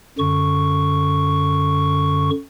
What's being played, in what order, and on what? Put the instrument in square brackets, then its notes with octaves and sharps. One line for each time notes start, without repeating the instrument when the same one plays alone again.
[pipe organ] F#2 D3 C#6